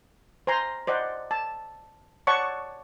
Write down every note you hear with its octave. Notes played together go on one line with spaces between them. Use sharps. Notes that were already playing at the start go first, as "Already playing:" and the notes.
C5 G#5 A#5 C6
C5 D5 D#5 F#5
A5
C#5 D5 F#5 A5 C#6